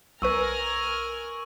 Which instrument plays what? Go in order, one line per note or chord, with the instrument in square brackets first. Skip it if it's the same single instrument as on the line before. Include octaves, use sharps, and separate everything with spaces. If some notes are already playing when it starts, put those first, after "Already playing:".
[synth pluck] B1 B4 [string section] A#4 G#5 F6 [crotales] C#6 E6